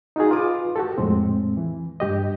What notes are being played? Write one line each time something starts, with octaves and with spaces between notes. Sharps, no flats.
D#4 F4 F#4 G#4
F4 B4 D6 D#6
F#4 G4 A4
F2 A2 G#3 C4
E3
G2 G4 D#5